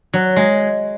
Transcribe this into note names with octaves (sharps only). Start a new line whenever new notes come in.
F#3
G#3